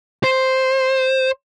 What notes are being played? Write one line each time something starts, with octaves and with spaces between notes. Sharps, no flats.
C5